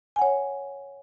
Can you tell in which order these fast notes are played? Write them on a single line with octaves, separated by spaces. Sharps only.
G#5 F#5 C#5